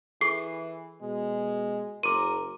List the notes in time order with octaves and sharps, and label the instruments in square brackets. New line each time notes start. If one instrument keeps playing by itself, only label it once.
[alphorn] E3 [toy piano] G#4 A4 C#6 [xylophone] C7
[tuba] B2 [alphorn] G#3
[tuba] F#1 [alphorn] A#4 [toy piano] C6 D6 [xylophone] D#7